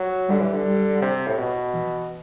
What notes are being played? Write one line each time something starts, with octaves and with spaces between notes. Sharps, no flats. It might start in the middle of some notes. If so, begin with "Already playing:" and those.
Already playing: F#3
D3 G3
E3
D3
G3
C3
A2
B2
E3